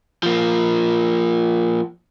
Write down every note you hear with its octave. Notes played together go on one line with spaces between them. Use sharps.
F3 A#3